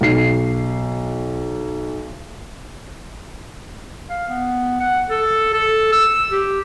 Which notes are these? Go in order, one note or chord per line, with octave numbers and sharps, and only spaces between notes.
B1 C7
F5
B3
F#5
A4
A4
E6
G4